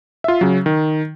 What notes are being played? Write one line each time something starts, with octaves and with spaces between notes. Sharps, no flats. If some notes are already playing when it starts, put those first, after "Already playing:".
F4 E5
C#3 F#3
D#3